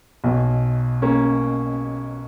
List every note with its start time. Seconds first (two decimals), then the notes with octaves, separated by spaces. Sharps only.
0.24 B1 B2
1.02 A#3 C#4